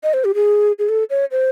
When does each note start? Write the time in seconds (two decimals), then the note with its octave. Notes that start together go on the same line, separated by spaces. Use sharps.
0.03 D#5
0.14 C5
0.25 G4
0.35 G#4
0.79 G#4
0.89 A4
1.10 C#5
1.31 C5